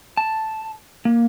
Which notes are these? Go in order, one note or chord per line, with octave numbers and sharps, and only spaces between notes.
A5
A#3